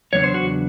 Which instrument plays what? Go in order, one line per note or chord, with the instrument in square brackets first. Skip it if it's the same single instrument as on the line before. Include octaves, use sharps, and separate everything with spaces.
[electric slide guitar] E2 C#3 F#3 B3 D4 C#5
C5
F#4